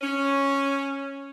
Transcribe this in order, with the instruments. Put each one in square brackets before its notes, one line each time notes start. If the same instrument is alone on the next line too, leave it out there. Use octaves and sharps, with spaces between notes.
[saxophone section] C#4